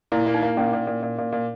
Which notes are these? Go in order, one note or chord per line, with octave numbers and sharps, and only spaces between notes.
A#2 E4
A#3
D#4
A#3
A#2 C#4
A#2
A#2
A#2
A#2
A#2